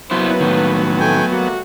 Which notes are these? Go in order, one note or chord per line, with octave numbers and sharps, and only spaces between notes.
F#3 A#3 B3 C#4 E4 B4 C5
A2 D#3
A3 G5 G#5
G3 A3 A#3 F#4